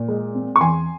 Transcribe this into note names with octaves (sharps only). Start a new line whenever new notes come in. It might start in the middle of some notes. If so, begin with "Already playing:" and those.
Already playing: A#2
G#3
C4
C#6
E2 G#5 C6